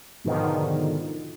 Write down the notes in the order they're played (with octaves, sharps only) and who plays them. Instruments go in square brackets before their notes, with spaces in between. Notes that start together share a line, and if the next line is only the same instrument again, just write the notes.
[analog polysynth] G#2 B2 D3 D#3 F3